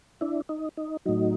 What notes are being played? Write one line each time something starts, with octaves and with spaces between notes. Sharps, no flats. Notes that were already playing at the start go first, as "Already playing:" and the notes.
D4 E4
D#4
D#4
A2 F#3 D#4